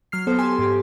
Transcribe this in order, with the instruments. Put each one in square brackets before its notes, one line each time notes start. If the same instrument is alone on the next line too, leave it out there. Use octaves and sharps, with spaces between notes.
[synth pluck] F#3 F6 C7
B3 A4 C5
G4 A4 G#5 C6
G#2 G4